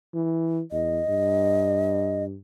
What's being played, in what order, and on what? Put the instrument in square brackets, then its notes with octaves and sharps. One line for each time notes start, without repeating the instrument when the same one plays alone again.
[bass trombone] E3
[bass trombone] E2 [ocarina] D#5
[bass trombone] G2